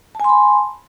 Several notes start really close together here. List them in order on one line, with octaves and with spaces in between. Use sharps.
A5 G#5 C6 B5